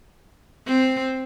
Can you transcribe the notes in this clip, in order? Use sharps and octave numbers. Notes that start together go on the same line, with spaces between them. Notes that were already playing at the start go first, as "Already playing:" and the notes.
C4